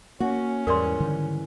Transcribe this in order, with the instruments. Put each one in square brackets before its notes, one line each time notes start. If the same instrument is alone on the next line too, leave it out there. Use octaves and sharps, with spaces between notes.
[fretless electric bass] A#3 [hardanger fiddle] C#4 [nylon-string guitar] F#4
[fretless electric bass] E2 [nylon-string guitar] G#2 E3 G3 [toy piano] A#4 D5 C6
[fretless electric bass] D3 D#3